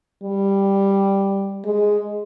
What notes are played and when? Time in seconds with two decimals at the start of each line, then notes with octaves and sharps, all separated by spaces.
0.23 G3
1.66 G#3